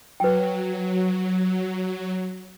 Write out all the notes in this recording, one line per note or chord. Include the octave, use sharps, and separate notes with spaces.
F#3 B4 G5